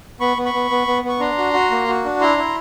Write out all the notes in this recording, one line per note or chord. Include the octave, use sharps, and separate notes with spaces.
B3 B5 C#6
B3
B5 C#6
B3
B3
B3
B3 C#6
D4 A#5 C6
F#4
F#4
A#3
F#4
D4
E4 A#5 C6
E4